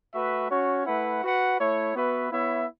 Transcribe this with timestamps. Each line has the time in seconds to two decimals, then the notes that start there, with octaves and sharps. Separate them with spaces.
0.14 A3 F#4 B4 E5
0.50 C#4 F#4 C#5
0.86 A3 E4 B4 F#5
1.23 F#4 B4 F#5
1.59 A3 E4 C#5
1.95 B3 F#4 B4 E5
2.31 B3 E4 C#5 E5